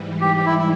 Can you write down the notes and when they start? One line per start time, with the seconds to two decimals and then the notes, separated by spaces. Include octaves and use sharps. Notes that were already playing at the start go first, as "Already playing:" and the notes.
Already playing: G#2 E3 G3
0.21 G4
0.36 G4
0.46 E4
0.59 E4